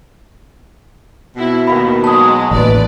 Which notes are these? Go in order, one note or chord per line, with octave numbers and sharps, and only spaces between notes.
B2 C4 E4
D#2 D#3 F5 B5
F#3 G#3 A5 D#6
A1 D#2 B4 D5